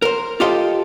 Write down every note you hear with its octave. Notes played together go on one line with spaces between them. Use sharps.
A#4 C5
F4 G4 A4 C5 D#5 F5